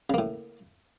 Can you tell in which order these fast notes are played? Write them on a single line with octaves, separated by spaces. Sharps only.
C#3 A#3 A2